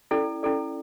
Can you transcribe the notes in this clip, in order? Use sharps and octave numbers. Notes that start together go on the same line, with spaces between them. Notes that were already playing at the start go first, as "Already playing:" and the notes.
C#4 E4 A4 D5
C#4 E4 A4 D5